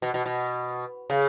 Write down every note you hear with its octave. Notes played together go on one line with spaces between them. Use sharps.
B2
B2
B2
C#3